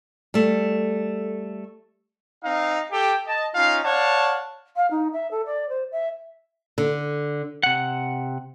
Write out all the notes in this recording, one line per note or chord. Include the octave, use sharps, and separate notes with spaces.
G3 A3
C4 D#4 F5
G4 A4 G5
D#5 A5
C#4 D#4 F4 F5
C#5 D5 F5 F#5 A5
F5
D#4
E5
A4
D5
C5
E5
D3
C3 F#5